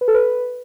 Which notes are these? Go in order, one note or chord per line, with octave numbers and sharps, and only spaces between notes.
B4
A4
B4